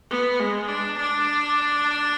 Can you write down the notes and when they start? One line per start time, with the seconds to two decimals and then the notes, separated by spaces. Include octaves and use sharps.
0.11 B3
0.40 G#3
0.68 D4
0.98 D4